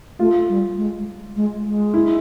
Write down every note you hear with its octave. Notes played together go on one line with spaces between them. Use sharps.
A3 F4
G3
G#3
G#3
G#3
E4